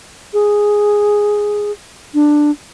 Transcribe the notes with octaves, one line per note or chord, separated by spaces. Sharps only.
G#4
D4